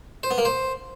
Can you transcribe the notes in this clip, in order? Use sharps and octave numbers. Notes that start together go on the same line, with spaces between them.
C5
B3
A#3
C5